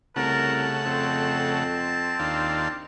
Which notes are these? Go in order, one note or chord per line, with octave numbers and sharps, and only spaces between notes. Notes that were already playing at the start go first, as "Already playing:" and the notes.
C2 C#3 A3 A#4 F#5 A5
F2 C4
D#2 D4 F4